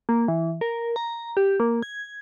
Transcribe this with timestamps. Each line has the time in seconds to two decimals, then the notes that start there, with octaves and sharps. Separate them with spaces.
0.09 A#3
0.28 E3
0.61 A#4
0.96 A#5
1.37 G4
1.60 A#3
1.83 G#6